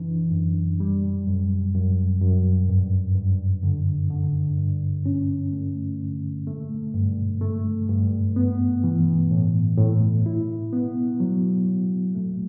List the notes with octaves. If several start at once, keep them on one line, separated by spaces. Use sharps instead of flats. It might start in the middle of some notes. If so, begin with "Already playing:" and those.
Already playing: F#2 E3 D4
F#2
G3
F#2
F#2
F#2
G2
G2
D3
D3
G2
C#4
A3
D3
A3
G2
A3
G2
B3
E3
A2
A2
E4
B3
F#3
F#3
A3